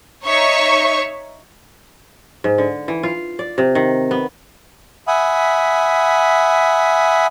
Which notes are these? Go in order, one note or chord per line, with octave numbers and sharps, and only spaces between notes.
D#4 C#5 E5 C#6
G#2
D3
E3
F4
D5
C3
D#3
B3
E5 F#5 G#5 B5 D#6